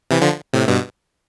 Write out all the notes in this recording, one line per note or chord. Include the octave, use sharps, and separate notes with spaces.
C3 E3
D3 F3
A2 C3
G2 B2